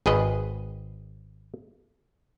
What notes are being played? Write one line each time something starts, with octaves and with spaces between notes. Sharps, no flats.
G#1 G#4 B4 D#5